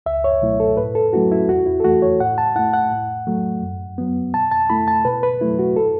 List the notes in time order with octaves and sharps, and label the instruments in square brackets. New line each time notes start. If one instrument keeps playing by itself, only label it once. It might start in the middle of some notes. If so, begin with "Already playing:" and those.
[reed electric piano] C#2 E5
C#5
B2 F#3 A3 E4
A4
A2 B4
A4
F#3 A3 C#4 E4 F#4
E4
E2 F#4
E4
A4
E3 A3 F#4
C#5
A2 F#5
A5
A3 E4 F#5
F#5
A2
F#3 A3
F#2
F#3 B3
B2 A5
A5
A3 E4 B5
A5
B2 B4
B4
F#3 A3 E4
F#4
A4